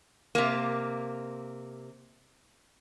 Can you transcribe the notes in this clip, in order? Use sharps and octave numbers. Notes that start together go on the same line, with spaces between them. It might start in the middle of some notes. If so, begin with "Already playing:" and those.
C3 A#3